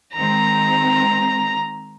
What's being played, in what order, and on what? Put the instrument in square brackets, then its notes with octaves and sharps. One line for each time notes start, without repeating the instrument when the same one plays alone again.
[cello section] D#3 G#3 C4 [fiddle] A#5